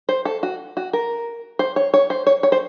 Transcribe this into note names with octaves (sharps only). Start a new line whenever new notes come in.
C5
A4
F#4
F#4
A#4
C5
C#5
C#5
C5
C#5
C#5
C5